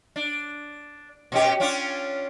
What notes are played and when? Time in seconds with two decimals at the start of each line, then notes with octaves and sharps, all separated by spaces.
0.16 D4
1.32 B2 C#4 G4
1.60 C#4 D4 F4